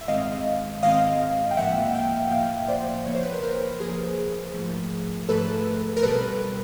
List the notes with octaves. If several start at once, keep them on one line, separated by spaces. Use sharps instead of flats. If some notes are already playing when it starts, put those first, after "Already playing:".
E5
G#2 D#3 G#3 C4 D#5 F5
G#2 D#3 G#3 C4 D#5 F5
G5
A2 F3 A#3 E5 F#5
F5 G5
A2 F3 A#3 F5 G5
C5 D5
C#3 F3 A#3 C#5
C5
B4
A#4 C5
A#4 C5
C#3 F3 A#3 G#4 A#4
G#2 F3 A3
G#2 F3 A3 A4 B4
A#4
B2 G3 C4 A4 B4